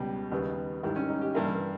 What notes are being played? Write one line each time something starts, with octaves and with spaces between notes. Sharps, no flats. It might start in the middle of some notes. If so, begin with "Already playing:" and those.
Already playing: C#2 B2 G3 G4
D#2 C#3 G3 B3
G#2 D#3 G3 E4
C#4
D#4
G4
G2 E3 A#3 E4